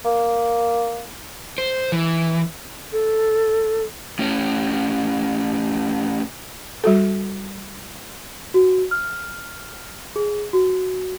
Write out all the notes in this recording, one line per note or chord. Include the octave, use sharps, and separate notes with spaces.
A#3
C5
E3
A4
A2 C#4
G3 F#4 A4
F#4
F6
G#4
F#4